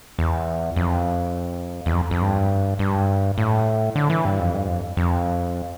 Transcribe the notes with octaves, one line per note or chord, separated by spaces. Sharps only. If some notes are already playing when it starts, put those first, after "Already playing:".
E2
F2
E2
F2
F2
G2
G2
A2
D3
E3
G2
F2
G2
F2
F2